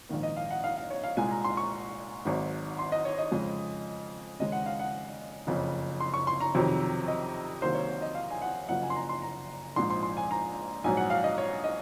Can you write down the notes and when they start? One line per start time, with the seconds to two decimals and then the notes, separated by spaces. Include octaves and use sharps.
0.09 A#1 G#2 D#3 A#3
0.23 D#5
0.36 F5
0.50 F#5
0.64 F5
0.77 F5
0.90 C#5
1.04 F5
1.17 C2 A#2 G#3 G#5
1.31 A#5
1.44 C6
1.57 C#6
2.25 G#1 G#2 F#3
2.79 C6
2.92 D#5
3.05 C#5
3.18 D#5
3.31 F2 C#3 G#3
4.39 D#2 C#3 G#3 D#5
4.52 F#5
4.66 F5
4.79 F#5
5.47 F#1 F2 C#3
6.00 C6
6.14 C#6
6.27 C6
6.40 A#5
6.55 F2 C3 D#3 F#3
7.08 D#5
7.62 C2 C3 D#3 F#3 A#3 C5
7.75 C#5
7.89 C#5
8.02 D#5
8.15 F5
8.30 G#5
8.42 F#5
8.69 F#1 F#2 F3 A#3 F#5
8.82 G#5
8.90 C6
8.96 A#5
9.09 C6
9.22 A#5
9.76 A#1 G#2 F3 G#3 C6
9.90 C6
10.03 C6
10.17 G#5
10.31 A#5
10.84 A#1 G#2 F#3 G#5
10.97 F#5
11.10 F5
11.24 D#5
11.38 C#5
11.64 D#5